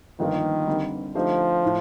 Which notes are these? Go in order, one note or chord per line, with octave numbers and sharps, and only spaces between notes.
G1 G2 D#3 F3 A#3
D3 G3 C4 D#4
D3 F3 A3 D#4 G4 C5
A2